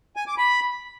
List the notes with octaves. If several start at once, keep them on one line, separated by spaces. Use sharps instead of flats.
G#5
D6
B5